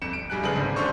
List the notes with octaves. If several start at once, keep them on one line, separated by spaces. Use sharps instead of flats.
G1 F2 C#7 E7
D7
B1 G2 G3 G#5 F#6
A#1 C#3 G#3 A4 B4 F#7
G#1 G#2 D3
D#2 C#4 D4 A4 C5 C#6